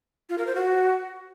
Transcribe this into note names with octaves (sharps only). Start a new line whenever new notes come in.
F4
A#4
C5
F#4